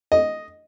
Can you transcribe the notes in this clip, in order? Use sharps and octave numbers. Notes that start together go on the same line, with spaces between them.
D#5